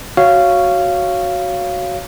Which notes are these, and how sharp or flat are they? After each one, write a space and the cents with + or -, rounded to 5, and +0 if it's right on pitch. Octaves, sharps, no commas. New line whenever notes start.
F#4 +0 C#5 +0 F5 -15